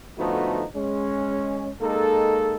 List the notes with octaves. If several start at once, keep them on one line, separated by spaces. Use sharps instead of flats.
D3 F3 A3 B3 D#4 F#4
G#3 C#4
G#3 A#3 D#4 A4